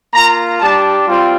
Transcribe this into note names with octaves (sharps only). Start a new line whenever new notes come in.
A#3 F4 A#5
G3 D4 G4 A5
G3 C4 F4